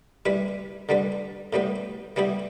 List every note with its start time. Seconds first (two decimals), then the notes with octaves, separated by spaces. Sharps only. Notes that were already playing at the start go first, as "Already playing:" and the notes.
0.26 G3 E4 B4
0.89 D3 G3 D4 B4
1.53 A2 G3 B3 G4 B4
2.16 E3 G3 B3 E4 G4